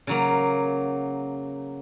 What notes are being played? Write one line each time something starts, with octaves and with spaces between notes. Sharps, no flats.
C#3 F#3 A#3